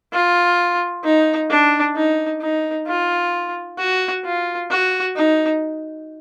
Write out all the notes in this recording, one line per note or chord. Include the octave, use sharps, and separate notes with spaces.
F4
D#4
D4
D#4
D#4
F4
F#4
F4
F#4
D#4